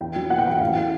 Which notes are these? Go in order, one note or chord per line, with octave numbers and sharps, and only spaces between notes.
E2 G5
F#3
B2 F#5
G5
E2 F#5
A1 F5
E3